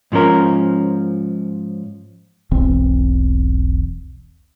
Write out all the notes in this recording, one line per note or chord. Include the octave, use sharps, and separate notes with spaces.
G#2 F3 C#4 A#4
E1 B1 E3 C4